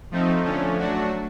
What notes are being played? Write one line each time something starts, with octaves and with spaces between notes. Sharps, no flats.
F3 A3 C4 D#4
D3 F3 A3 C#4
F#3 A3 D4 F#4